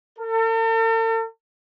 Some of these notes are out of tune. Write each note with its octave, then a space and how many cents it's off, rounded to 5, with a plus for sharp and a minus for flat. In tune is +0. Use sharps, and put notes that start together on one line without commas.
A4 +45